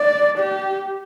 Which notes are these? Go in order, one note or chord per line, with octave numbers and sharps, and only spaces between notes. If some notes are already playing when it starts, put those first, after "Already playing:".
Already playing: D5
G4